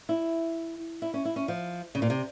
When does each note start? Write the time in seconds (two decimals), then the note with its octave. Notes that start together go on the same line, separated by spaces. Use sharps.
0.09 E4
1.02 E4
1.14 C#4
1.25 E4
1.36 C#4
1.48 F3
1.95 C#3
2.02 A#2
2.10 C3